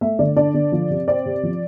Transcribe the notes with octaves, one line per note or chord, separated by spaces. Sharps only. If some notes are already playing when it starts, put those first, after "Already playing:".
A3 E5
D3 D5
D4 D5
D3
F3
C3
C4 D5
C3
F3